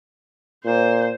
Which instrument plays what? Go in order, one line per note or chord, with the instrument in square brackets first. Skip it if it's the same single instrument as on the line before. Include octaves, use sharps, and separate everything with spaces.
[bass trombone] A#2 [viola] C5